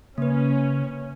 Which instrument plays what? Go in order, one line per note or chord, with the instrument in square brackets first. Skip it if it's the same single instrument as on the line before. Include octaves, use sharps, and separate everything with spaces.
[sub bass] C#3 [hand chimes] A#3 B4 [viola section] C#4